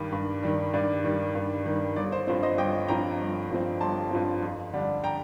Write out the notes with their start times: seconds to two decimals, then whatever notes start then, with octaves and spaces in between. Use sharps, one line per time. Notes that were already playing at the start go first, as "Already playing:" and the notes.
Already playing: G2 D#3 G3 D5
0.12 G2
0.43 D#3 G3
0.74 G2 D5
1.04 D#3 G3
1.35 G2
1.66 D#3 G3
1.96 G1 D5
2.12 C5
2.27 G2 F3 C4 C5
2.43 C5 D#5
2.58 G1 D#5 G5
2.88 G2 F3 C4 G5 A#5
3.20 G1
3.51 G2 F3 C4
3.81 G1 A5 C6
4.11 G2 F3 C4
4.43 F2
4.73 D3 G3 D4
5.04 G5 A#5